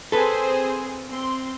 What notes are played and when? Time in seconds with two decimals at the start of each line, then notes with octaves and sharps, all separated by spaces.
0.12 C4 G#4 A4 B4 C5
1.10 C4 C6